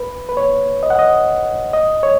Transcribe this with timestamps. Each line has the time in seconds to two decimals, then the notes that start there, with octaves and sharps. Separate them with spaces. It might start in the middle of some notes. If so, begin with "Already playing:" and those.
Already playing: B4
0.29 B4
0.37 C#5
0.83 D#5
0.90 F#5
0.99 D#5
1.73 D#5
2.03 C#5